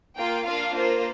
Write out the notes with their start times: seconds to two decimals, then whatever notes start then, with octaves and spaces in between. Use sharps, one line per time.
0.17 A#3 F4 G5
0.45 A#3 D4 F4 F5
0.74 A#3 F4 C5